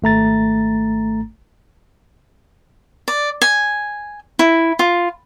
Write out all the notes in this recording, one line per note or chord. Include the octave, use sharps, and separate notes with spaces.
G#1 A3 A#5 A6
D5
G#5
E4
F4